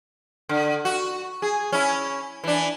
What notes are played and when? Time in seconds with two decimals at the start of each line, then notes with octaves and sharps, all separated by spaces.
0.49 D3
0.85 F#4
1.42 G#4
1.73 C#4 E4
2.44 E3 D4